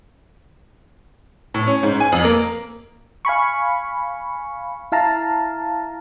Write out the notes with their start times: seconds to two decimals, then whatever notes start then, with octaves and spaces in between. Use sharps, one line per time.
1.54 A2
1.67 C#4
1.83 G#2
2.00 G#5
2.12 F2
2.25 A#3
3.25 F5 G#5 B5 C#6
4.92 E4 F5 A5 A#5